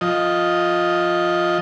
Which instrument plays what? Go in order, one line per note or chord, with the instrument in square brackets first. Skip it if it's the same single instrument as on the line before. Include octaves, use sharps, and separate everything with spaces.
[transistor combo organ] F3 D#5